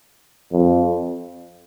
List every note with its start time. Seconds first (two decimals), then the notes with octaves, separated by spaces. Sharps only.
0.52 F2